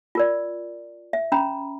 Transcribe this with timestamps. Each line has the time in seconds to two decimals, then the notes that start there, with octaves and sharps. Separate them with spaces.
0.15 F4 A#4 D5
1.13 E5
1.32 C#4 A#5 B5